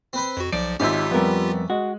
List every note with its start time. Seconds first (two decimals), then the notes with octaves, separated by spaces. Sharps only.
0.13 C4 B4 C5
0.37 F2 F#4
0.52 B1 F3 D5 D7
0.80 G#1 G#2 C#4 F4 G4 E5
1.11 F2 G3 B3 A#4
1.70 G#3 F#4